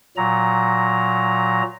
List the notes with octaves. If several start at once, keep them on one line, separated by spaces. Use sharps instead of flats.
A#2 F#3 A#5